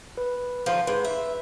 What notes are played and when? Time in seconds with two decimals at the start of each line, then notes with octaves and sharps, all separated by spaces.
0.17 B4
0.66 D3 D#3 F3
0.87 G#2 B4
1.04 E5